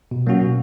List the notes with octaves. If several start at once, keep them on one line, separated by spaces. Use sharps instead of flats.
B2
F#3 A#3 C#4 F#4
B2